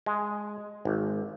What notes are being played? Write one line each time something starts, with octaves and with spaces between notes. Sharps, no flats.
G#3
G#1